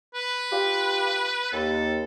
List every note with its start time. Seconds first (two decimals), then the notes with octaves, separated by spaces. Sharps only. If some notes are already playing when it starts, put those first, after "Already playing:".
0.15 B4
0.51 F4 G4
1.52 D#2 A4